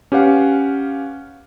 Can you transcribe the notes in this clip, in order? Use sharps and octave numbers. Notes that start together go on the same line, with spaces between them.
C#4 G4 B4 F5 F#5